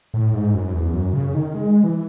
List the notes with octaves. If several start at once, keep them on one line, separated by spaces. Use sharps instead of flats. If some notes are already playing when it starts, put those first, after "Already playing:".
A2
G#2
F#2
E2
F#2
C#3
D#3
G#3
E3